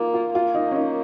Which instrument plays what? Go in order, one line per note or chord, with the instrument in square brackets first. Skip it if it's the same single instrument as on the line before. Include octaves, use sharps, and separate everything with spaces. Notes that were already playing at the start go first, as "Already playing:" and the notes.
Already playing: [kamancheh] A#3 [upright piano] D#4 F4
[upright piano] F4
[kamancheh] A#3 [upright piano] F4
[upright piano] D#4
C#4
D#4